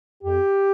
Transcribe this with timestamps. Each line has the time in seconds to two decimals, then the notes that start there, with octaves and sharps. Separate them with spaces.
0.23 F2 G4